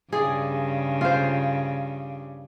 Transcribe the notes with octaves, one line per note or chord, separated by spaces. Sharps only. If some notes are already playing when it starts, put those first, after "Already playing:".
G2 C#3 G#4 D5
F4 C5